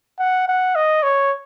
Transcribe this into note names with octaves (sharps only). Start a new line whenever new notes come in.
F#5
F#5
D#5
C#5